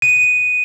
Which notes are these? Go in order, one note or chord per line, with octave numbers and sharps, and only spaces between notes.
D#7